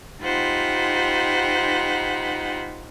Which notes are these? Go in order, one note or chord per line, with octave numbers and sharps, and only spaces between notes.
D#4 F4 G4 C5 F#5 B5